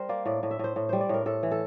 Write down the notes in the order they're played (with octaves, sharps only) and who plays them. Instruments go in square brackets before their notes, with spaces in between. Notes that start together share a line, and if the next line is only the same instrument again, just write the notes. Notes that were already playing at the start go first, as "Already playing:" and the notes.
Already playing: [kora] G3 A#4 C5
A#3 D5
A2 D5
A2
E5
A2 C5
A2
G3 C5
D5
A2 A#4
A2 A4
E3
A4